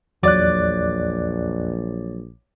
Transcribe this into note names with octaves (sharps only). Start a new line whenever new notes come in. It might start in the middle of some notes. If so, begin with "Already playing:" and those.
A#1 E2 F#3 C#5 D5 D6 F#6 A6